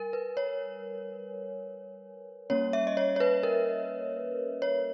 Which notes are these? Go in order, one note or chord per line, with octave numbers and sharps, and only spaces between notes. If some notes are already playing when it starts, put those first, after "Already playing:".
Already playing: G3 A#4 G#5
B4
C#5
G3 A#3 C#4 C#5
E5
D#5
C#5
C#5
B4
A#4
C#5